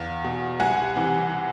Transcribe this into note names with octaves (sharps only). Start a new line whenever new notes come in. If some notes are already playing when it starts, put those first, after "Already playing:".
Already playing: E2 F5
B2
C2 F#5 G#5
C3 E3